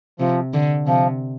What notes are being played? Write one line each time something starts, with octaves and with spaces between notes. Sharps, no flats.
C3 F3
D3
C3 F3